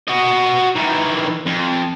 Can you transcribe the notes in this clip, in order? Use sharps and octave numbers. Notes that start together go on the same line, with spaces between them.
F#4 D#5
D#3 E3
F2